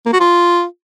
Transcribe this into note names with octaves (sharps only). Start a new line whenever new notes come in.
A#3
F#4
F4